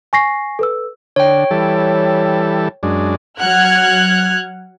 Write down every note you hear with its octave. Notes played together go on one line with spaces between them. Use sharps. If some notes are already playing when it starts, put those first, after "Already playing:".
G#5 C#6 A#6 C7
A4 B4 E6
D3 C#5 G5
E3 G3 A4
F#2 G#3 D4
F#3 F#5 F6 F#6 G#6